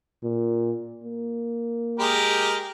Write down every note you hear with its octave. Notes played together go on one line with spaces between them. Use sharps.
A#2
A#3
G#3 G4 A#4